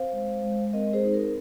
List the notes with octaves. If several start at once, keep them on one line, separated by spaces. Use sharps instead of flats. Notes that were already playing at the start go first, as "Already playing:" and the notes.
Already playing: C4 C5 F5
G#3
G#3
C4 A#4 D#5
G#4 C5
D#4
A#4